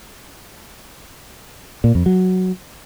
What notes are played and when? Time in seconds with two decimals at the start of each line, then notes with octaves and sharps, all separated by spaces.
1.84 A#2
1.95 F2
2.06 F#3